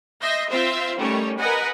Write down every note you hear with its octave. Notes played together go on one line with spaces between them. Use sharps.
D#5 E5 C6 G6 A#6
C4 F4 C5 E5 F5
D#3 G3 A3 C#4 C#5
A#4 B4 D#5 F#5 G#5